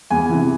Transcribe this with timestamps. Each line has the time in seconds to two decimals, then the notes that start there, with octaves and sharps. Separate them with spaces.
0.10 E2 G#5
0.29 C3 E3